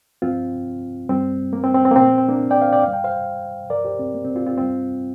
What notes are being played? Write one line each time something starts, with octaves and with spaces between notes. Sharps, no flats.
G2 F3 C4 F4
G2 G3 C4
A#3
C4
C4
C4
A#3
A#2 F3 C4
A#3
C4
A#3 D4
D5 G5
C5 F5
D5 G5
G2 G3 F5
G5
C5 F5
G2 F3 A#4 D5
G4 C5
C4
A#3
C4
C4 F4
C4 F4
G2 G3 C4 F4